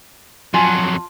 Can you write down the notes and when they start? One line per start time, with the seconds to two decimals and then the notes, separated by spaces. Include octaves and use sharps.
0.54 F2 F#3 F4 G#5 A5